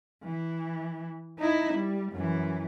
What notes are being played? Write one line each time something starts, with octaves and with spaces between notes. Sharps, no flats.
E3
D#4 E4
G3
F#2 E3